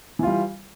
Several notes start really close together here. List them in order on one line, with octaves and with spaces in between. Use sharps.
E3 F4 G3